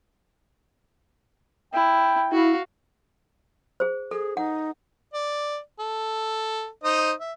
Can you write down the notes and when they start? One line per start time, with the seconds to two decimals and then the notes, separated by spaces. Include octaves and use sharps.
1.74 E4 G5
2.32 E4 F#4 F5
3.80 G#4 C5
4.11 G#4 A4
4.37 D#4 F#5
5.14 D5
5.79 A4
6.84 D#4 C5 D#5
7.20 E5